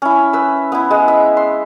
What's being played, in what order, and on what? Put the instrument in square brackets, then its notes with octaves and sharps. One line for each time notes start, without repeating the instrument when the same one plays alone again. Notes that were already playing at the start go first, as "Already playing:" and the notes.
[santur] C#4 E4
B4 E6
B3 E4
G#3
E5
C6